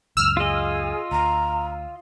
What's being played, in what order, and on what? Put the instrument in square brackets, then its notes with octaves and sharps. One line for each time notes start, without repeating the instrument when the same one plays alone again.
[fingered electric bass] C#2 F#2 [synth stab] E6 F6
[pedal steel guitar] F4 D#5 [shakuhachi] G#4
[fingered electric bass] D2 [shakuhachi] A#5